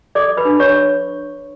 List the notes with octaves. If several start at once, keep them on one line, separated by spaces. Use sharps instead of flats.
A4 D5 D6
B4 B5
D4
C#5 C#6